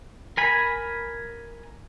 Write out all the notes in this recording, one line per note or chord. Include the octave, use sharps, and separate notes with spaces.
A#4 G#5 B5